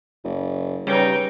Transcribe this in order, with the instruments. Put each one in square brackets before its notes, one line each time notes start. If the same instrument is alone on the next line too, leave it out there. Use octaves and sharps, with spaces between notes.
[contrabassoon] F#1
[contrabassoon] C#3 [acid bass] G3 [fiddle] D#4 G5 [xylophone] B4 C#5